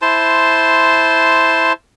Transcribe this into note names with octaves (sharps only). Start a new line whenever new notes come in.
E4 C5 A5 C6